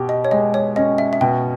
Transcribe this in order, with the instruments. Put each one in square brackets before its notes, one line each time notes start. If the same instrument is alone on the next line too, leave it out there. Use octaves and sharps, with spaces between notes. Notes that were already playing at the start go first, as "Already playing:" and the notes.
Already playing: [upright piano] B2 G4
[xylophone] D#5
C#5
[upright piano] G#3 [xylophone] D#5
[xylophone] C#5
[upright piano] C#4 [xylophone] D#5
[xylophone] E5
E5
[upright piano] B2 [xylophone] G5